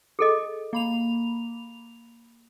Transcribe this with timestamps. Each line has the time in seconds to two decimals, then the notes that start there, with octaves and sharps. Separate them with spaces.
0.19 G#4 A4 D#5
0.73 A#3 B5 F7